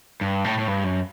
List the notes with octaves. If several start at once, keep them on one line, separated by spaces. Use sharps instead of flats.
G2
A2
A2
G2
F#2